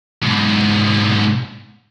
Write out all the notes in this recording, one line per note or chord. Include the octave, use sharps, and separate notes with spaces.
G#2 B2